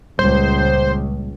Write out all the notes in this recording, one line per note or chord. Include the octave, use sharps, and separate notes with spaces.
C#2 A#2 G3 C5